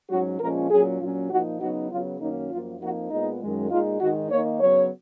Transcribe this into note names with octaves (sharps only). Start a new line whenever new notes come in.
G#2 F#3 C#4 F#4
A#2 F3 G#3 C#4 A#4
A#2 F#3 C#4 G#4
A#2 F#3 C#4 F4
A#2 F3 A#3 D#4 F#4
C#3 F#3 B3 D#4 F#4
C#3 F#3 B3 F4
F#2 D#3 F#3 A#3 C#4 D#4
F#2 F3 A#3 F4
F2 F3 A#3 D#4 F#4
A#2 G#3 B3 D#4
F#2 D#3 G#3
A#2 G#3 D#4 F4
G#2 D#3 G#3 D#4 F#4
D#3 A#3 D#4 C#5
C#3 F#3 B3 C#5